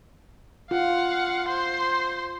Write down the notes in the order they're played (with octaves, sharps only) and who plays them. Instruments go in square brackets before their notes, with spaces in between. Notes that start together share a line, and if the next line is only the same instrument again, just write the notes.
[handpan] F4 [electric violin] F5 F#5
[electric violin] C5 C6